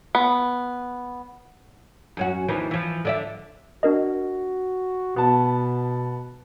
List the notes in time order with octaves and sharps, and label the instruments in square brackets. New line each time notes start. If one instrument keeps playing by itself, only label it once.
[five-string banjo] B3
[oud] F#2 C#4 F#4
D#2 E3 F3
E3 F3
D3 D5 E5
[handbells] D4 A#4 D#5 [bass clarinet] F#4
[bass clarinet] B2 [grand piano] B3 A5